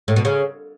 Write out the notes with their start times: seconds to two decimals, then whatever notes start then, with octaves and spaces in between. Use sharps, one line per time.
0.08 A2
0.16 B2
0.25 C#3